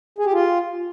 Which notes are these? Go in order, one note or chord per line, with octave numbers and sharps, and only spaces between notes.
G#4
G4
F4